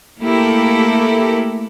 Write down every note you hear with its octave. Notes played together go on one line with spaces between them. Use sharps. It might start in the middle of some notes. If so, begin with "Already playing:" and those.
A3 A#3 E4 G4 A4 A#4